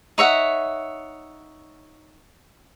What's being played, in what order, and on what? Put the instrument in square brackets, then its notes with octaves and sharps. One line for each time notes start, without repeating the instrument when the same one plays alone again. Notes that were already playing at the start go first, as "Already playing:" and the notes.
[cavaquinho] D#4 C#5 E5 F#5